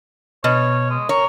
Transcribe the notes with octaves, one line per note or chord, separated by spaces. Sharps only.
B2 C#5
G#3
A#4 C#5